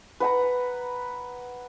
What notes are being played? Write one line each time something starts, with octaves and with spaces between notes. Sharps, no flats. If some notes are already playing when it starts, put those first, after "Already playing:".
B4 F#5 A#5